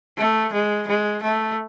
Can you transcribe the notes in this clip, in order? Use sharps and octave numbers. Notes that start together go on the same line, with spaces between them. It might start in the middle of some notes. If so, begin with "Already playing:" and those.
A3
G#3
G#3
A3